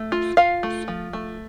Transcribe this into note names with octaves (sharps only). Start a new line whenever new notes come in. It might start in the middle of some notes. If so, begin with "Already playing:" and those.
Already playing: A3
F4
F4 F5
A3
F3
A3